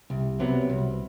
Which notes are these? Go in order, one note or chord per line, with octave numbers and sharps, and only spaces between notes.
C2
C3 F#3 B3
C2